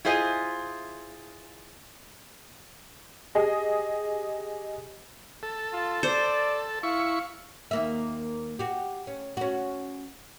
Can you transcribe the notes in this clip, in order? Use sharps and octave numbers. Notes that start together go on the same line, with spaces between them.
E4 F4 G#4 C5 D#5 G#5
G4 G#4 D#5
A4
F4
C5 D5
E4 F5 C#6
D#2 A#3 E5
F#4 G4
C#4
C#4 F#4